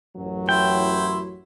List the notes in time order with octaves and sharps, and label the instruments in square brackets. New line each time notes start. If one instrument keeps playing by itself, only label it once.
[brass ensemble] A1 F#2 F#3
[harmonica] E4 C6 [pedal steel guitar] G5